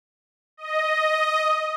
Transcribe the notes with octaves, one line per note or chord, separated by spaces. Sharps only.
D#5